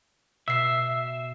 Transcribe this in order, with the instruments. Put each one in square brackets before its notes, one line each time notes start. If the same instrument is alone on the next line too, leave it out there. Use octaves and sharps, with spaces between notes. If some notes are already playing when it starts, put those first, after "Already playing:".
[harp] B2 [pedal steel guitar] E5 [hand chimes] E6 C7